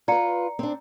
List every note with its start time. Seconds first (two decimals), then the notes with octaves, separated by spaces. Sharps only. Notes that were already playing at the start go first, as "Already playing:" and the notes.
0.08 F4 B4 D5 A#5 C#7
0.59 C4 D4